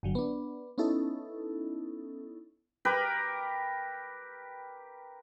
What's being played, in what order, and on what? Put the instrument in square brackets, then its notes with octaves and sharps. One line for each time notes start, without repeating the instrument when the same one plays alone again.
[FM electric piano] G1 D3 F#3
B3 D4
B3 C#4 D#4 E4 A4
[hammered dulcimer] G4 A#4 B4